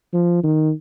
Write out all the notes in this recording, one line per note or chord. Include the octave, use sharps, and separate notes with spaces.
F3
D#3